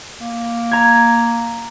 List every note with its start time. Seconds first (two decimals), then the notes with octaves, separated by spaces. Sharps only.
0.21 A#3
0.71 A#5 G#6